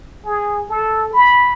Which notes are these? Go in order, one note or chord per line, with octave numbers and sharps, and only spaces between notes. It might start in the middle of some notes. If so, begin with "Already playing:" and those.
G#4
A4
B5